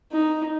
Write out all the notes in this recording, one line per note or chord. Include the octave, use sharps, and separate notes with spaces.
D#4